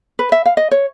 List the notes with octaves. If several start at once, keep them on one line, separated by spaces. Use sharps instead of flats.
B4
E5
F5
D#5
C#5